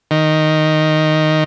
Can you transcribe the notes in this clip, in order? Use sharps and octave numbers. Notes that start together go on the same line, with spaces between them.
D#3